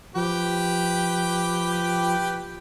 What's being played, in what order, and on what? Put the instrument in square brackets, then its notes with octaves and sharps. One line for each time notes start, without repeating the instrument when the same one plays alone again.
[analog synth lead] F3 [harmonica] G4 B4 G5